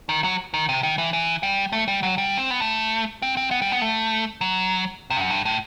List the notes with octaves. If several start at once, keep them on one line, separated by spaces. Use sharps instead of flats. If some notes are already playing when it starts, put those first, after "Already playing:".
D#3
F#3
D#3
C3
D#3
E3
E3
G3
A3
G3
F#3
G3
C4
B3
A3
C4
C4
B3
G3
B3
A3
F#3
C3
G2
F#2
G2
A2